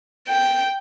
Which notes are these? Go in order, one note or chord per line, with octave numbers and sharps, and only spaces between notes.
G5